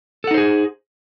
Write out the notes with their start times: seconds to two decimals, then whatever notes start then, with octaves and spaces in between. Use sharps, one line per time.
0.24 A4
0.27 F#5
0.31 D#4
0.34 C5
0.38 G#4